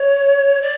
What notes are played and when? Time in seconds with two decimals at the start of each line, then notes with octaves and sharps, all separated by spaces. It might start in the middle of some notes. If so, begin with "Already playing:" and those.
Already playing: C#5
0.61 D5